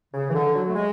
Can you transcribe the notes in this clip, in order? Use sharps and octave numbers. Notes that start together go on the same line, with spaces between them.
C#3
E3
D3
F#3
A3
G#3